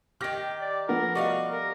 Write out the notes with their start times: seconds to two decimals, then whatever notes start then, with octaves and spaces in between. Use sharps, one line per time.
0.21 D#3 G4 F6 A#6 D7
0.61 D5
0.88 F3 A3 B3 A#4
1.15 G3 F#4 D#5 F5
1.51 A#4